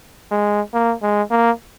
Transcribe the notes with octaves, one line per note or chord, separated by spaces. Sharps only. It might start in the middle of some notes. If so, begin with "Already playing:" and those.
G#3
A#3
G#3
A#3